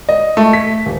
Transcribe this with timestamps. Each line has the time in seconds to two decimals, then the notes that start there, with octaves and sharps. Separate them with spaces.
0.09 D#5
0.37 A3
0.53 B6
0.86 D#1